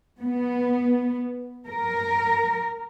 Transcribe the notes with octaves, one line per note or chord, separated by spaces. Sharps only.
B3
A#4